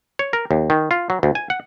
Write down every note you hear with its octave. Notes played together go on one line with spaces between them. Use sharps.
C#5
A#4
D#2
D#3
F4
F#3
D2
G#5
F#5